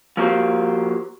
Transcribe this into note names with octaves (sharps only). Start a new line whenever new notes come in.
F3 A#3 F#4 G4 C5